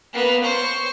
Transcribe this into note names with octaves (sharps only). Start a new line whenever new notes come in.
A#3 B3
C5 C#6